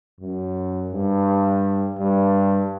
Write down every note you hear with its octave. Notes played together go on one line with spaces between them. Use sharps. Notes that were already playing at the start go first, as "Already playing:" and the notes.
F#2
G2
G2